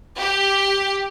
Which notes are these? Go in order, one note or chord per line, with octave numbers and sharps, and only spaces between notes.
G4